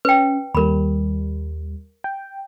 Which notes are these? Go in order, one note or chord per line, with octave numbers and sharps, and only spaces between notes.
C#4 B4 G5
D#2 G3 A#4 B5
G5